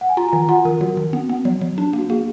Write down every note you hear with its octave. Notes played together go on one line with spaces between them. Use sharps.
F#5
G#5
F4 A#5
A#5
D#3 G#5
F4 F#5
D#3 A#4
F#3 F#4
D#3
B3
B3
F#3
F#3
D4
A#3
F#4
A#3 G#4